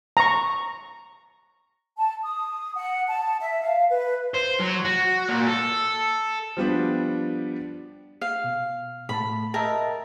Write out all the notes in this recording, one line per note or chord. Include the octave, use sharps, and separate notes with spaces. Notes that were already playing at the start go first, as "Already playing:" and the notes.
A#5 C#6
A5
D#6
F#5
A5
E5
F5
B4
C5
F#3
F#4
A#2
A4
F3 G3 B3 D4
F5
B2
A2 A3 A5 B5
A#4 D#5 E5 G5 A5